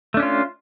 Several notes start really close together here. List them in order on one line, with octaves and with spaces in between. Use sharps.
A3 D4 C#4 F4